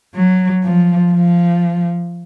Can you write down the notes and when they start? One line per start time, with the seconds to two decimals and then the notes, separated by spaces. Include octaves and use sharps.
0.15 F#3
0.63 F3
1.13 F3